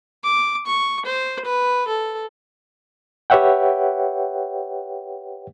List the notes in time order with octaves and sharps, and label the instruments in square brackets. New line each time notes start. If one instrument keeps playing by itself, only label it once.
[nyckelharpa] D6
C#6
C5
B4
A4
[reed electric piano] G4 B4 C#5 E5 F#5 G5